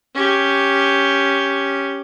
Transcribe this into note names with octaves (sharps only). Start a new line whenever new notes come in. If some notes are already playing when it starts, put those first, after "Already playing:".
C#4 G4